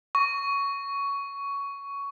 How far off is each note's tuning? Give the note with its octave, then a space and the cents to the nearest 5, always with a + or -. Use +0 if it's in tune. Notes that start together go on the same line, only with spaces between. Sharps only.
C#6 +15